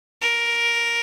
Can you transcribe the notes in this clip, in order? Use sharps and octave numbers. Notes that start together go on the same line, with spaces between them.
A#4